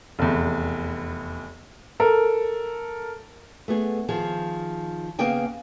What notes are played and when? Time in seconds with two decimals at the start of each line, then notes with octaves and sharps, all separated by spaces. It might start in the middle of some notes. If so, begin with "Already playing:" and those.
0.19 F1 E2
2.00 A4 A#4
3.68 A3 B3 G#4
4.08 D#3 F3 G#4
5.19 C#3 A#3 B3 G#4 G5 G#5